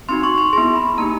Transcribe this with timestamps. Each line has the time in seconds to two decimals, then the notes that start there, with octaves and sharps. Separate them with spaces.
0.09 C4 D#4 F#4 C6
0.23 C#6
0.38 C6
0.53 B3 E4 G#4 C6
0.76 B5
0.98 A#3 D#4 G4 A#5